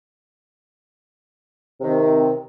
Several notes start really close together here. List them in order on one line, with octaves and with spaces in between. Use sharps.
C3 D#3 C4